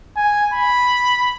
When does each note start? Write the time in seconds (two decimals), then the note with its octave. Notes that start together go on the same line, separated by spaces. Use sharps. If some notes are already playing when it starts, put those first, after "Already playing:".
0.17 G#5
0.54 B5